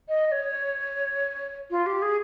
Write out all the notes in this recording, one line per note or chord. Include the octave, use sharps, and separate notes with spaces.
D#5
C#5
F4
G4
G#4